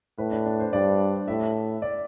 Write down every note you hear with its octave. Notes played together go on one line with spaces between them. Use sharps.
A2 B4
D4
D4
C5
G2 D5
A2 E5
D5